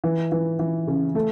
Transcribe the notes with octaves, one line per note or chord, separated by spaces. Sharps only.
E3
E3
E3
C#3
A3